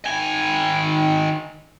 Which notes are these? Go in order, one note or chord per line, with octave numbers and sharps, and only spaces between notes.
D#3 G#5